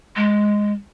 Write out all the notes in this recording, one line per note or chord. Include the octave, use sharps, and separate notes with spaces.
G#3